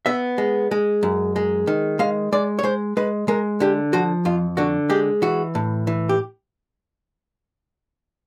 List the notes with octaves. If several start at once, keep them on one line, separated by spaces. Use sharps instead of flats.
B3 E5
G#3
G#3
F#2
G#3
D#3
G#3 F5
G#3 D5
C#5
G#3 C5
G#3 B4
G#3 A#4
D3 G4
F3 F#4
F2 F4
D3 F#4
G#3 G4
E3 F#4
A2
E3
G4